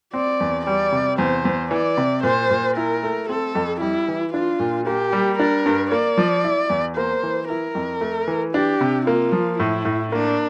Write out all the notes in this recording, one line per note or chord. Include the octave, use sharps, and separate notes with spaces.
C4 D5
E2
G3 D5
C3
E2 C5
E2
E3 D5
C3
A#2 C5
A#2
E4 A#4
A3
C4 A4
F2
G3 E4
E3
D4 F4
A#2
A#3 G4
G3
D4 A#4
G2
A#3 D5
F3
E4
E2
A#3 C5
E3
E4 A#4
F2
A3
E3
D4 G4
C3
A#3 F4
F3
A2 E4
A2
A#3 D4